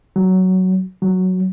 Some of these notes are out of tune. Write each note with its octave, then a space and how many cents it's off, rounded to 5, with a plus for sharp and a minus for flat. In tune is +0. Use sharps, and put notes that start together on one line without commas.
F#3 +10
F#3 +0